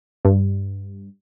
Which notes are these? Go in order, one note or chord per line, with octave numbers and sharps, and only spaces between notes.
G2